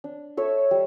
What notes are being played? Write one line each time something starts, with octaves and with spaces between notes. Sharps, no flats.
D4
A4 C#5 E5
G3